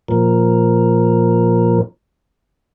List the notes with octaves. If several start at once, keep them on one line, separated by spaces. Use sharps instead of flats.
A#2 F3 A#4